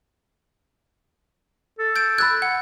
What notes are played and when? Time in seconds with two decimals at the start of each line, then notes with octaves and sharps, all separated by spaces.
1.79 A4
1.96 G6 D7
2.18 B5 E6 F#6 G#6 A6
2.42 F#5